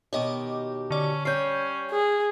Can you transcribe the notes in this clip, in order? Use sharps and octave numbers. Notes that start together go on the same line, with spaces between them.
B2 D#3 G4 C#5 D#5 D6
D3 C#4 D5
G3 C#4 C#5 G6 C7
G#4